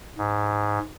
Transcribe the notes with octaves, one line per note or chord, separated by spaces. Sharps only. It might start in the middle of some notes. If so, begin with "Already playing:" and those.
G#2